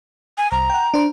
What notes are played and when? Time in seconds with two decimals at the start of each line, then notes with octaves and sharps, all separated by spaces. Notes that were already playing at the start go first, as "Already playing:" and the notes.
0.38 G#5
0.52 C2 A#5
0.70 F#5 G5
0.94 D4 C5